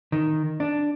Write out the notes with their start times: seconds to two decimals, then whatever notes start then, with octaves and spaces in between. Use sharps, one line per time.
0.12 D#3
0.60 D4